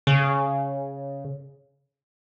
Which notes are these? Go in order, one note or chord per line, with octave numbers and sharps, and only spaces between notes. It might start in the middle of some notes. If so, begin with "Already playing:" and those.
C#3